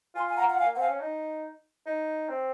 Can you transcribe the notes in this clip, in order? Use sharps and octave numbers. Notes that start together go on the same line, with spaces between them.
F4 G#5 C6
G#5
F#5 A#5
F#5
F5 G#5
A#3
C4 F5 F#5 G#5
C#4
D#4
D#4
C4